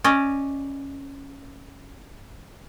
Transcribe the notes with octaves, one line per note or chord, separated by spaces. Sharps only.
C#4 D5 D#5